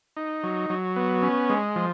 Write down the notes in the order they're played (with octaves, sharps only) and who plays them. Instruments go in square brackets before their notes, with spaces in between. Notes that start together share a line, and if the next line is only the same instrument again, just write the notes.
[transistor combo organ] D#4
F#3
F#3
B3
C#4
G#3
F3